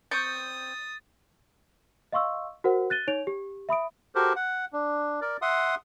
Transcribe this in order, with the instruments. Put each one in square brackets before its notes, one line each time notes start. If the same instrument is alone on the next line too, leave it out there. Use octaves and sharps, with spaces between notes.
[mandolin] C4 C#6 G6 [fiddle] D#6 [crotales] A6
[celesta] D#5 F5 C6 C#6 E6
F#4 A#4 C5 F#5
F#6 A6 D#7 G7
D#4 C#5 D7 F7
G4
E5 B5 D#6 D7
[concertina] F#4 G4 A4 A#4 C5
F#5
D4
A#4 D5
E5 F#5 C6 D#6